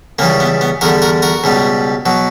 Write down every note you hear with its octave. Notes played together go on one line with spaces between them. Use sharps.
C#2 C#3 E3 G3 A#3
B3
B3
E2 D3 G3 F#4 A#4
F#4 A#4
F#4 A#4
C#2 B2 G3
B2 F#3